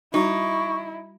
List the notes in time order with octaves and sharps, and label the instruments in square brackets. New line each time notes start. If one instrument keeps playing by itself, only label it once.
[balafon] G3 F#4 [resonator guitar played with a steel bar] D#4 [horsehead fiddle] E4 [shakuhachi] C#6